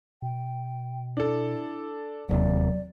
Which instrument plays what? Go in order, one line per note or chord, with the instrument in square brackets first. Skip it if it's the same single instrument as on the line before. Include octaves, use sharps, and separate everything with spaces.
[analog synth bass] B2 [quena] G5
[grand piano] D4 A4 [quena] E4
[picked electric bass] E1 D#2 C3 [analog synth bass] F#3 [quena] D5